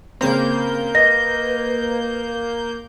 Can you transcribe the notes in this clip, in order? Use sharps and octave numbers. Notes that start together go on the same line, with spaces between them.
C#3 A#3 C4 G6
B4 D#5 A#6